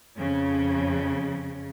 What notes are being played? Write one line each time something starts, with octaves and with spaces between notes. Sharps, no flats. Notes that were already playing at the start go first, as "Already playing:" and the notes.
F2 C#3